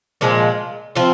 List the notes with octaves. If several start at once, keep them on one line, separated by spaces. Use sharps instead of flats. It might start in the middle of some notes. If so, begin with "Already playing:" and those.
A#2 F3 G#3
F3 C4 F4